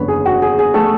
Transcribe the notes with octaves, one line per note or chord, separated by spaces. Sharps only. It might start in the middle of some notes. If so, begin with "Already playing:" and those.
Already playing: F#1 E2 D3 B3 C#4 B4 C#5
G#4
F#4
G#4
G#4
A3 A4